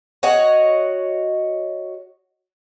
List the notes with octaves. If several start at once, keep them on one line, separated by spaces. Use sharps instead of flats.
F#4 C#5 D#5 F#5